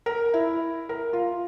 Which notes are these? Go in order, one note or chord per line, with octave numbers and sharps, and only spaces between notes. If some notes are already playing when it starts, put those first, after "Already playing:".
A#4
E4
A#4
F4